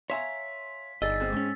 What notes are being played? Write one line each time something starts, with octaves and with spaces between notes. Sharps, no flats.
C#5 E5 F5 G#5 A#5 C6 B6
G1 D#4 G#4 D5 D#5 E6 A6
G#3 C4 C5
G#2 C#4